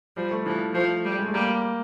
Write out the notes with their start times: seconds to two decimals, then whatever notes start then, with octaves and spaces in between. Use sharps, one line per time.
0.16 F3 G3
0.31 A3
0.46 E3 F3
0.75 F3 A3
1.05 G3
1.18 G#3
1.27 A3
1.34 G3 A#3